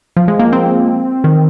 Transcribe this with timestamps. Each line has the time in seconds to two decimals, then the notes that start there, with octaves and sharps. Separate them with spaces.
0.17 F3
0.28 G#3
0.39 A#3
0.52 C4
1.24 D#3